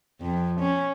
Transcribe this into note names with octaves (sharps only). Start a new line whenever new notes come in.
F2
C#4